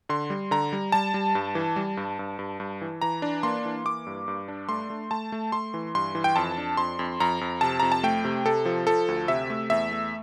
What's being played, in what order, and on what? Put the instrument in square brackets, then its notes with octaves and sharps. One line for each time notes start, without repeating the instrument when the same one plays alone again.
[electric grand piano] D3 C6
G3
D3 A#5
G3
G3 A5
G3
G2
E3
G3
G2
G2
G2
G2
E3
E3 A#5
D4
A#3 C6
E3
A#3 D6
G2
G2
D4
A3 C6
A3
A3 A5
A3
A3 C6
E3
G2 C6
E3
G5
F2 A5
D4
F2 C6
F2
F2 A#5
F2
C3 A5
F2 A#5
A5
A3 G5
C3
C3 A4
F3
F3 A4
D2
C3 E5
A3
E2 E5
A3